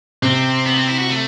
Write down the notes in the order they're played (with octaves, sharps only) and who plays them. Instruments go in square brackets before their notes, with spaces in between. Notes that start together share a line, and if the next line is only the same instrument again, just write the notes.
[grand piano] C3 [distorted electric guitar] C4
[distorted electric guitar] B3
C4
E4
F#4
A3